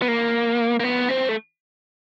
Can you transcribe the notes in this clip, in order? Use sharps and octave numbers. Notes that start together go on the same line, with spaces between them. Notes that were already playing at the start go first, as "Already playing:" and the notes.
B3
A#3
A#3
B3
C4
A3